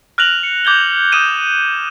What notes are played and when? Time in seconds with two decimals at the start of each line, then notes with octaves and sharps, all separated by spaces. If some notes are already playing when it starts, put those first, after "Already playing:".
0.18 F6 F#6 A#6 F7 F#7
0.43 C#7
0.65 D6 G6 G#6 G7
1.12 D#6 G6 D#7 E7